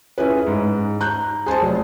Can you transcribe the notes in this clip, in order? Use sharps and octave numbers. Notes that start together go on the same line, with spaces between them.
C#4 E4 G#4 B4
G#2
A#5 F#6 G6
G#4 C5 G#5 A5
F1 F#3